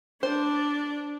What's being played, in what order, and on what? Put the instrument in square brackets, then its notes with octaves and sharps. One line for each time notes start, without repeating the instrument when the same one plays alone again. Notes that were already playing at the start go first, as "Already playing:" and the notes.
[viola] D4 [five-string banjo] C5